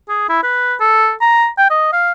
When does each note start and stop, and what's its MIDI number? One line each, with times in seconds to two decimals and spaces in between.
0.09 0.26 68
0.29 0.42 64
0.43 0.74 71
0.80 1.12 69
1.21 1.47 82
1.58 1.70 79
1.70 1.92 75
1.93 2.12 77